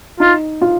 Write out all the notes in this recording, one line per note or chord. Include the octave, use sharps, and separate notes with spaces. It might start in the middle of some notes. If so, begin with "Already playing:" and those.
D#4 F4
F4